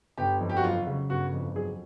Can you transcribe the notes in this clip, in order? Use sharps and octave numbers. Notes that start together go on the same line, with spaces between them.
G1 G4
F2
G4
F#4
F#3 F4
C#3
G1 F#4
F2
F#3 G#4